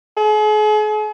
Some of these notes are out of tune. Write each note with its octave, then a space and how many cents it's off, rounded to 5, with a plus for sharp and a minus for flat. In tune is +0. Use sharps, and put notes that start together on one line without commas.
G#4 +40